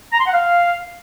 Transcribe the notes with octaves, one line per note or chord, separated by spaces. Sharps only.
A#5
C6
F#5
F5